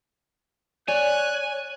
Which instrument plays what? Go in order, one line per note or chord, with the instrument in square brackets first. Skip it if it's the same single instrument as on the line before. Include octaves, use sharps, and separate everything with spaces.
[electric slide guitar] C#5 [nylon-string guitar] D5 [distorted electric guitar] G#5 [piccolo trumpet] F#6